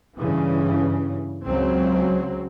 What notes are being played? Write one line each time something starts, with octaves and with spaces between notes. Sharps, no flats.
G2 C#3 E3
C#2 C#3 F#3 C4